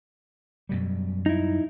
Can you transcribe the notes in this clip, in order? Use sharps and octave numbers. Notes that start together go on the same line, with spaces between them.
F#2 B2 G3
D#4 E4